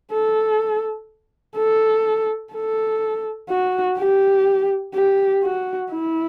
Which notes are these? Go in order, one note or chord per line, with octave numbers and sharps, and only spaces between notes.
A4
A4
A4
F#4
G4
G4
F#4
E4